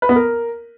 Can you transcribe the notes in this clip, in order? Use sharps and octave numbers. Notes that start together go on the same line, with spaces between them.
B4
B3
A#4